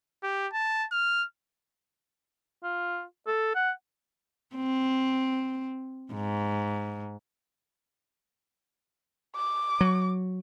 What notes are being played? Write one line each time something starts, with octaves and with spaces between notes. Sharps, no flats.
G4
A5
F6
F4
A4
F#5
C4
G#2
D6
F#3